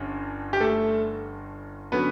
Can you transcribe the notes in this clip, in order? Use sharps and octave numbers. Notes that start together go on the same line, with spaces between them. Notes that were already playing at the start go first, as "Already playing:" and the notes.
Already playing: G1 G2 G3 C#4
G4
A3 A4
D3 F#3 B3 C#4 B4